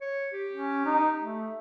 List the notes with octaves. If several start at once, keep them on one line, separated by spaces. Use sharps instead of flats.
C#5
G4
C#4
D#4
A3